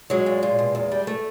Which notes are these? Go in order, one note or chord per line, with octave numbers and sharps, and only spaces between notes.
F#3 G#3
A#2
A#2
B2
E2
G3
A3